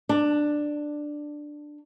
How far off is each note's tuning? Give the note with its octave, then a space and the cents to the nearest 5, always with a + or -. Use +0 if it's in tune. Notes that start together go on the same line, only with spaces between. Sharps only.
D4 +10